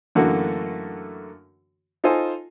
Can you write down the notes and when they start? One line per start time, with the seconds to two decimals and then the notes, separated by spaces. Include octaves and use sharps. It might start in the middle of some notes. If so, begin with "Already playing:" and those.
0.15 F#2 D3 E3 A3 A#3 F#4
2.04 D#4 F4 A4 C5 G#5